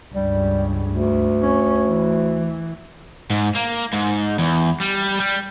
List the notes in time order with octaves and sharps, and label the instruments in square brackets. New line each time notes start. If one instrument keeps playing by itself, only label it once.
[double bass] C#2 G2 [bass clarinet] G3
[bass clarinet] D2
[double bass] C#4
E3
[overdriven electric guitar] G#2
A#3
G#2
E2
G3
G3